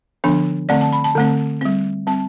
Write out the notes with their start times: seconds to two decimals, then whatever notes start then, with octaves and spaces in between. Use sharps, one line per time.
0.24 D3 F3 B3 D4
0.69 D3 A3 C4 D5
0.81 A5
0.93 B5
1.04 A5
1.15 D3 A3 C4
1.61 G3 C4
2.07 G3 C4 A5